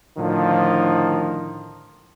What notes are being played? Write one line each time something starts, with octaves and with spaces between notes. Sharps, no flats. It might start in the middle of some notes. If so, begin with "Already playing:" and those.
A2 D3 D#3 F3